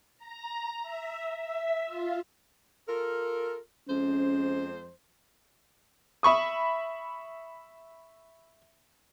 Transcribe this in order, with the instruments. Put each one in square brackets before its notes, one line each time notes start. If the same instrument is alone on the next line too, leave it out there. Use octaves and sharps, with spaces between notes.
[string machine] A#5
E5
E5
F4
[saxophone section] F4 A4 A#4
[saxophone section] F2 G#3 C5 [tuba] C#4
[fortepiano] E5 B5 C#6 D#6